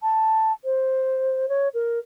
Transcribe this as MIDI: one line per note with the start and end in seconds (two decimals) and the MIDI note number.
0.01 0.51 81
0.64 1.48 72
1.48 1.68 73
1.73 1.98 70